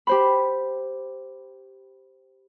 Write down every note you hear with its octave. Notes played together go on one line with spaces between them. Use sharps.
G4 C5 B5